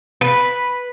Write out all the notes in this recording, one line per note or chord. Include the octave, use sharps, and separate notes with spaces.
B4